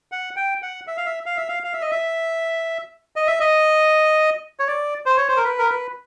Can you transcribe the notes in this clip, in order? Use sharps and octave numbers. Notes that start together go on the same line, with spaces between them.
F#5
G5
F#5
E5
F5
E5
F5
E5
F5
F5
E5
D#5
E5
D#5
E5
D#5
C#5
D5
C5
C#5
C5
A#4
B4
A#4
B4